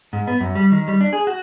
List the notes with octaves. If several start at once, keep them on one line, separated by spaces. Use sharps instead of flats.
G#2
B3
F#2
G3
D#3
G3
D4
G#4
F#4